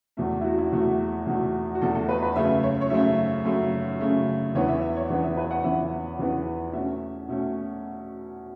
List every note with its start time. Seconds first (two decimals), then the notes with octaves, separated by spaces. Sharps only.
0.17 E2 B2 A3 E5
0.41 E4
0.44 F#4
0.58 E4
0.72 E2 B2 A3 F#4
1.27 E2 B2 A3
1.75 F#4
1.81 E2 B2 A3 A4
1.95 A4
2.09 B4
2.23 B4
2.36 F#2 C#3 A3 E5
2.63 C#5
2.81 C#5
2.90 F#2 C#3 A3 E5
3.45 F#2 C#3 A3
4.00 F#2 C#3 A3
4.54 E2 E3 B3 C#5
4.68 E5
4.81 E5
4.96 C#5
5.10 E2 E3 B3
5.23 E5
5.37 B4
5.50 F#5
5.64 E2 E3 B3 E5
6.19 E2 E3 B3
6.73 B2 A3 C#4 E5
7.29 B2 A3 C#4